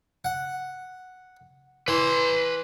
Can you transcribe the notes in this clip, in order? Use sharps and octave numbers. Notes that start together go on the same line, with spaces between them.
F#5
E3 B4 C6